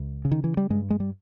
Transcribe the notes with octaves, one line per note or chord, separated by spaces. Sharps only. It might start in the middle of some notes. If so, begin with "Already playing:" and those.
Already playing: C#2
C#3
D#3
E3
G3
G2 G#3
G#3
G3